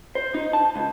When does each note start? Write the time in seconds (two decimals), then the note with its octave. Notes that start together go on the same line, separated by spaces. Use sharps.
0.15 C5
0.34 D#4
0.53 A5
0.76 C#2